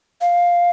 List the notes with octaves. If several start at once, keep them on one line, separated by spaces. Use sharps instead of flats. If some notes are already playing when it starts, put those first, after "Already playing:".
F5